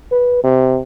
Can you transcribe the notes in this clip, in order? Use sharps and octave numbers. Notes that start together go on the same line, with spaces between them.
B4
C3